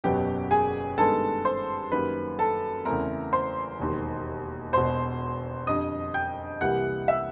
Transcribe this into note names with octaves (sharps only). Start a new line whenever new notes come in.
F#1 E2 B2 F#3 B3 G4 G5
G#4 G#5
G2 D#3 G#3 B3 A4 A5
C5 C6
F#2 D#3 G3 A#3 B4 B5
A4 A5
E2 C#3 E3 A3 C4 A#4 A#5
C5 C6
E1 D#2 D#3
E1 E2 B2 C5 C6
F2 D3 G3 D#5 D#6
G5 G6
C2 C3 E3 G3 A#3 F#5 F#6
E5 E6